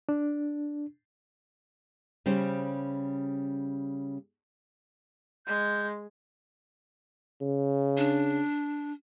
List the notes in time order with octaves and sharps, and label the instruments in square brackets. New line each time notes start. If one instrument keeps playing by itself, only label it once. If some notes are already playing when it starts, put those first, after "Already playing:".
[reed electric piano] D4
[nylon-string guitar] C#3 G3 C#4 C5
[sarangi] G#3 [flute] G6
[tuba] C#3
[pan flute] D4